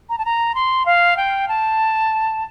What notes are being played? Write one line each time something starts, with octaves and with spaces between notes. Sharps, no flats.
A#5
A5
A#5
C6
F5
G5
A5